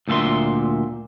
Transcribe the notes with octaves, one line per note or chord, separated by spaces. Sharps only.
D2 A#2 A4 E5 C6